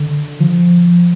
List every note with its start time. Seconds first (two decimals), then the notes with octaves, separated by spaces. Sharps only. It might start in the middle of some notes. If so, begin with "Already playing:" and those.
Already playing: D3
0.40 F3